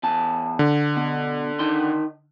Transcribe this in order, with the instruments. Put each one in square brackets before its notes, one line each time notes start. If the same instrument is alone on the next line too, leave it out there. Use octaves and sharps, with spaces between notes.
[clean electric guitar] E2 A5
[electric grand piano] D3
[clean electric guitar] B2
D#3 D#4 C6